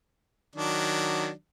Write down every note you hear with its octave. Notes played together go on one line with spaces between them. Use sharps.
D#3 F#3 D4